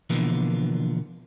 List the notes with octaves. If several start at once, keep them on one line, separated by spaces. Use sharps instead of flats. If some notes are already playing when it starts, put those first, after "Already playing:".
B2 D3 E3 F3 A#3 B3